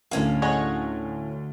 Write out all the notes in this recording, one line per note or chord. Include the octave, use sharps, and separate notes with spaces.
D2 A2 C#4 F5
G#4 C#5 D#5 F#5